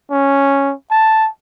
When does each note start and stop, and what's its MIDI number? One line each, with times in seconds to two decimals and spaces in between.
0.11 0.74 61
0.91 1.29 81